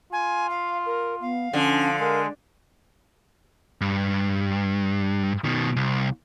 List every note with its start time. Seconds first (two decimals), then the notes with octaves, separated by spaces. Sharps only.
0.12 F4 G#5
0.49 F5
0.86 A#4
1.21 B3 F5
1.53 D3 F3 C#4
1.99 G#3 A#4
3.81 G2
5.45 B2 D#3
5.76 C2